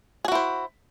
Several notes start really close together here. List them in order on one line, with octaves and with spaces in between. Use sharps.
G#4 F#4 E4 C5